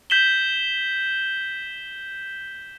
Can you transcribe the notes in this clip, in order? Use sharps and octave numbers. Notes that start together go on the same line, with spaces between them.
G6 B6 E7 F#7 G7